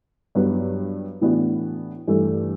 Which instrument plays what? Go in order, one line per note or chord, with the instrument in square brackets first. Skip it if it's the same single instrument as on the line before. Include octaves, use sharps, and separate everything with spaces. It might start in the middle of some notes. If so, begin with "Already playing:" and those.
[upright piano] G2 F#3 B3 E4 B4
A2 E3 B3 D4 F#4
G2 E3 A3